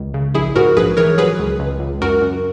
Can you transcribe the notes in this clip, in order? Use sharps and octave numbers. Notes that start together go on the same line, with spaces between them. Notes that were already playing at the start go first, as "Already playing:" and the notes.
Already playing: C#2
C#3
A#1 E4 G#4
G#2 F#4 A#4
A#1 G#4 B4
E3 A#4 C#5
F#3 G#4 B4
C#2
C#2
C#2
F#2 F#4 A#4
F#2